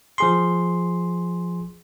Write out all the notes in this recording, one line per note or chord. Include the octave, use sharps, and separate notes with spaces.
F3 G#4 C6